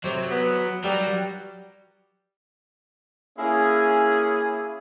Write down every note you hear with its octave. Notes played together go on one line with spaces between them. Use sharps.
C3 F#3
B3
F#3 G3
A#3 C#4 E4 G#4